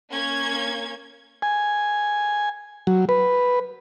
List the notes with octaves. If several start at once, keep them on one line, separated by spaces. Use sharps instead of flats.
A#3 C#4 G#6
G#5
F#3
B4